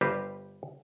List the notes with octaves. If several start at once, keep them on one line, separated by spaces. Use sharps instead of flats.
G1 G3 G4 B4 C5 A#5